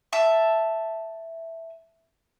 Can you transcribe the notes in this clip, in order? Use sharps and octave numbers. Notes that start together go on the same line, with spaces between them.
E5 A5 E6